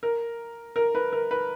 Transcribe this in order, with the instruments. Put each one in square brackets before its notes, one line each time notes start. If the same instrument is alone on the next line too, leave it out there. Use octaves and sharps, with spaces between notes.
[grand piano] A#4
A#4
B4
A#4
B4